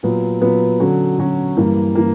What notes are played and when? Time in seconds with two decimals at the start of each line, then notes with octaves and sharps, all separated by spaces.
0.03 A#2 F#3 B3
0.41 A#2 F#3 B3
0.80 D3 F#3 C#4 F#4
1.18 D3 F#3 C#4 F#4
1.57 G2 E3 A#3
1.95 E3 A#3